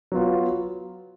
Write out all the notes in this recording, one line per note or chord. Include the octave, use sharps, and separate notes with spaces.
F#3 B3 F4